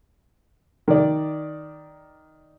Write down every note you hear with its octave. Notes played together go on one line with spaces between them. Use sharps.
D#3 D5